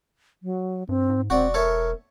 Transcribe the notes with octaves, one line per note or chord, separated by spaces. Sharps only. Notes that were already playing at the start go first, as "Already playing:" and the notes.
F#3
G2 C4
G#2
E1 C4 F#4 D5
A4 A#4 C#5 E5